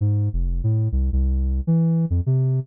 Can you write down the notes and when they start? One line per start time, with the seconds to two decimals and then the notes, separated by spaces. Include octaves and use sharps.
0.01 G#2
0.33 F1
0.64 A2
0.92 C2
1.12 C2
1.67 E3
2.10 F2
2.26 C3